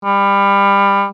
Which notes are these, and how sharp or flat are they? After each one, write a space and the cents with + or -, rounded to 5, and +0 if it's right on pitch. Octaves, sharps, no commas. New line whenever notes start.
G3 +25